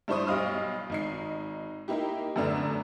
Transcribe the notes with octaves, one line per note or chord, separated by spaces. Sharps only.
G2 D4 E4 C5 C#6 D#6
B1 G3 D#5 F5 D#6 F6
G#1 D#4 C7
A#3 D#4 E4 G4
F#2 A2 D3 B3 D4 A#5